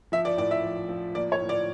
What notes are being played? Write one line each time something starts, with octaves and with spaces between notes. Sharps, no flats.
F3 E5
D5
A2 D5
E5
F3
F3
A#3 D5
C#5
A2
D5